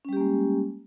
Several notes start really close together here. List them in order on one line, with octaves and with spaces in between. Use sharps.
C#4 G3 G4 A#3 G#3